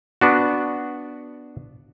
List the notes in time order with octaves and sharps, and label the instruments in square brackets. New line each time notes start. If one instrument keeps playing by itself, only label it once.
[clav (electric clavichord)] B3 D4 F#4